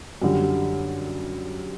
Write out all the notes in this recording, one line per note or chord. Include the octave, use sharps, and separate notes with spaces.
F#2 D3 G3